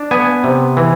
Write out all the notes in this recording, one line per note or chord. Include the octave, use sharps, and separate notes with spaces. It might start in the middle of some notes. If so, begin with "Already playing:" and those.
Already playing: D4
B3 G#5
C3
E3